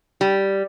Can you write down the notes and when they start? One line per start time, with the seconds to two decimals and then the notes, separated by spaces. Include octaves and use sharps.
0.21 G3